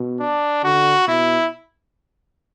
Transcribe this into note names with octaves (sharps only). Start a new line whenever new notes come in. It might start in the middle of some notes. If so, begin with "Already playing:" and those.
Already playing: B2
D4
D3 F#4
B2 E4